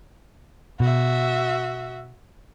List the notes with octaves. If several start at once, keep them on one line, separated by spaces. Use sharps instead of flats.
B2 F#4 E5